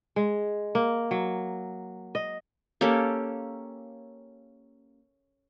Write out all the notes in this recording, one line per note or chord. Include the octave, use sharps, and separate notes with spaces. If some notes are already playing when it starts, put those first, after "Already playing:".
G#3
A#3
F#3
D#5
A#3 C#4 G4 A4